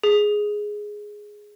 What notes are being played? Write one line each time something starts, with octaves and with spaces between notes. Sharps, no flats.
G#4